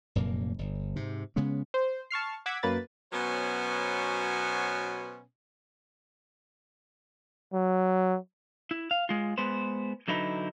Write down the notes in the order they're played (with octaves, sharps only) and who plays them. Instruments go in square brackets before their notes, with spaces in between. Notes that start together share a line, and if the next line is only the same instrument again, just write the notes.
[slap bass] F1 F#2 A#2 A#3
G1
G#2 C3
C#3 G#3 B3 C#4
[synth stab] C5
A5 C#6 F6 C7
F#5 D6 E6 G#6 B6
F#2 A#3 B4 A6
[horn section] B2 F#3 B3 C#4 C5 G#5
[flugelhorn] F#3
[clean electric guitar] E4
F5
G#3 F4
G#3 B3 B4 C5
D3 F#3 D#4 E4 B4